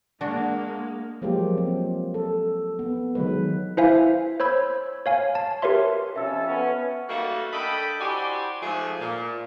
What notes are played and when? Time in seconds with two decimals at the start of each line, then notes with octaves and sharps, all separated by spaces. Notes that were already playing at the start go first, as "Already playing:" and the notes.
0.21 G#3 A#3 D4 F#4
1.22 F3 F#3 G#3 A#3 F4 G4
1.58 C4
2.14 A4
2.79 B3
3.15 D#3 F#3 G#3 B4
3.77 E4 B4 C5 E5 F5 G#5
4.40 C5 C#5 B5 E6 G#6
5.06 C#5 F5 G#5
5.35 A5
5.62 G4 A#4 B4 C#5 E5 C6
6.16 F2 C#4 A4 E5 E6
6.47 B3 C#4
7.09 G3 A3 A#3 D#4 F#4
7.53 D4 A4 D#5 G5 B5
8.01 E4 F#4 G4 C5 D5 G#5
8.62 G#2 F3 A3 G#4
9.00 A#2